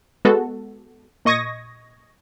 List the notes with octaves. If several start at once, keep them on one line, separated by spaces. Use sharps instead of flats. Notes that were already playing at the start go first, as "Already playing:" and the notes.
G#3 B3 F#4 A4
A#2 D#5 C#6 D#6 G#6 A#6